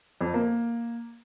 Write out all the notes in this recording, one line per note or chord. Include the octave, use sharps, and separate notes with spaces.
F2
A#3